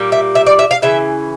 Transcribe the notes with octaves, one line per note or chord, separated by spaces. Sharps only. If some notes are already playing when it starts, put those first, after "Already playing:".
Already playing: A#2 G3 A#3
E5
E5
D5
E5
F5
C#3 E3 E5